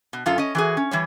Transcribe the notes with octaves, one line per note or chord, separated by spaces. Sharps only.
B2
F#2 F4 A4
C#4 D#5
E3 F#4 G#4
C#4
E3 G3 C#5